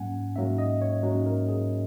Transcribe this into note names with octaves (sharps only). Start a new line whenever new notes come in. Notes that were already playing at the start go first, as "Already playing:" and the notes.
Already playing: G#2 F#3 A#3 C#4 F#5 G#5
G#2 F#3 A#3 C#4 E5
D#5
C#5
G#2 F#3 A#3 C#4
A#4
G#4